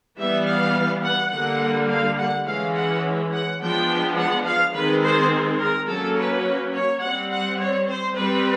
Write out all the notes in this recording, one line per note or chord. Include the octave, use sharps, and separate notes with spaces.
E3 G3 B3 E5
F5
F#5
D3 G3 A#3 F#5
F5
F#5
E3 G#3 C#4 F5
F#5
F#5
F3 G#3 B3 D4 G5
F#5
F5
D#3 G#3 C4 B4
C5
A#4
F#3 A#3 C#4 A4
B4
C#5
G3 C4 F#5
F#5
C#5
C5
G3 C4 B4